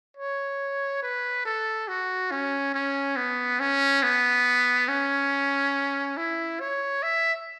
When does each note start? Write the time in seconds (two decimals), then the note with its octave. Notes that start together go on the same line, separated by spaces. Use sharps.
0.17 C#5
1.02 B4
1.45 A4
1.88 F#4
2.31 C#4
2.74 C#4
3.17 B3
3.60 C#4
4.03 B3
4.88 C#4
6.17 E4
6.60 C#5
7.03 E5